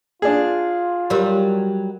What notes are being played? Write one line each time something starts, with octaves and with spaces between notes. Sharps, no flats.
D4 F4 G#4
F#3 G3 G4 A#4 C6